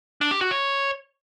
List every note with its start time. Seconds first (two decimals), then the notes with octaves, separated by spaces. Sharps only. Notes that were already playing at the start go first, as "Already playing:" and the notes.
0.21 D4
0.31 G4
0.41 F#4
0.51 C#5